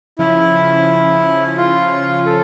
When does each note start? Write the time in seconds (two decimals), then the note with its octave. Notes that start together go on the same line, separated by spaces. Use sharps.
0.19 C#3 F3 C#4 E4
1.57 F4
2.26 A4